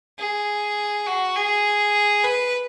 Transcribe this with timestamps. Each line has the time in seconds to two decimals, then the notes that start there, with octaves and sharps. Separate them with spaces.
0.18 G#4
1.06 F#4
1.36 G#4
2.24 B4